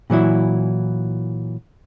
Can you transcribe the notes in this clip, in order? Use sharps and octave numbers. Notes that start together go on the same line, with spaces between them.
A#2 E3 F#3 E4